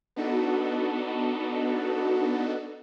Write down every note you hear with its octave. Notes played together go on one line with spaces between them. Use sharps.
B3 D4 D#4 F#4 A4